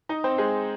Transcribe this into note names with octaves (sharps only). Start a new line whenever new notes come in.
D#4 D#5
C4 C5
G#3 G#4